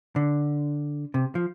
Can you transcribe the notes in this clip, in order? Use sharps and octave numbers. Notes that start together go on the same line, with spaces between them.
D3
C3
F3